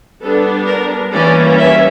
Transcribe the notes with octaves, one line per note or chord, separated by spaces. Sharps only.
G3 B3 D4 A4
A#4
E3 G3 A#3 C#4 D5
E5